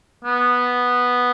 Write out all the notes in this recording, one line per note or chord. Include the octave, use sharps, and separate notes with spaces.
B3